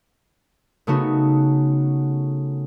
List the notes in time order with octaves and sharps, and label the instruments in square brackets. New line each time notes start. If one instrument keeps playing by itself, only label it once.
[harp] C#3 A3 B3 D#4 F#4